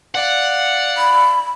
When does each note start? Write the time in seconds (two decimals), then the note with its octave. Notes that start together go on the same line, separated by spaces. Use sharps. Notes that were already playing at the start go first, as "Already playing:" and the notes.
0.15 D5 F5 F#5
0.97 B5